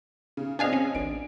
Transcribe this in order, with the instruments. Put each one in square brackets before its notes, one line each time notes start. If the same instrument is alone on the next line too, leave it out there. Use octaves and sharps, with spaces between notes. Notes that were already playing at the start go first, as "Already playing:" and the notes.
[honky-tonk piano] C#3
[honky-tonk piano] C4 D#5 G#5 [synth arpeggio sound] D4 G#4 F5
[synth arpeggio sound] C#4
[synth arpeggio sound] A1 [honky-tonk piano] D4 D7